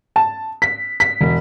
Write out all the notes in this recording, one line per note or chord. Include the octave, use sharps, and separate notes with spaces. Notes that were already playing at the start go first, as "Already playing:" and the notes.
A5
B6
B6
E1